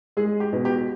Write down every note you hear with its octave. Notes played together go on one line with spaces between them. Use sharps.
G#3 G#4
G4
B2
G4